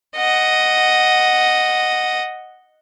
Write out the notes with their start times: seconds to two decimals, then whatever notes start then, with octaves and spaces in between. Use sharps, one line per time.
0.16 D#5 F#5